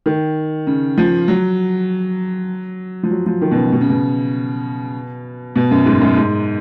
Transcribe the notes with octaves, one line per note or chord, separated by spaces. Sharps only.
D#3
C#3
F3
F#3
F3
F#3
F3
D#3
B2
C#3
B2
C#3
B2
B2
F#2
G#2
F#2
G#2